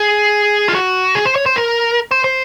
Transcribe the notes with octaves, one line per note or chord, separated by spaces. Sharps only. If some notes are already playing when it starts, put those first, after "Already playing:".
Already playing: G#4
F4
F#4
G#4
C5
C#5
C5
A#4
C5
C5